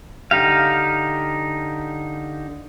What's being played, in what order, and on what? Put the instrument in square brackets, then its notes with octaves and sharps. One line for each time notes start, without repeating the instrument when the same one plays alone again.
[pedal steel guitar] D3 D#4 G4 F5